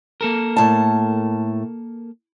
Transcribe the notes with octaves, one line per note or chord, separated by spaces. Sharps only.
A#3 A4 A#4
A2 A5